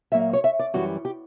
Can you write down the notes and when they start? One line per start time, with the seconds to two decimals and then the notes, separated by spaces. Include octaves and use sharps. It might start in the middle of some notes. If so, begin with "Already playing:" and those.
0.12 A#2 F#3 A#3 E5
0.33 C#5
0.44 E5
0.59 D5
0.74 F#2 E3 G3 F#4
1.05 G4